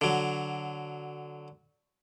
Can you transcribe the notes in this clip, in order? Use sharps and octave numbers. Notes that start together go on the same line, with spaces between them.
D3 F#3